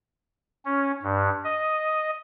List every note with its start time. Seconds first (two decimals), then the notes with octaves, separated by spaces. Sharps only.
0.65 C#4
1.03 G2
1.44 D#5